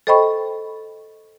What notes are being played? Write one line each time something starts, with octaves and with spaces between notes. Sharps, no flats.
A4 C5 D#5 G5 B5 C#6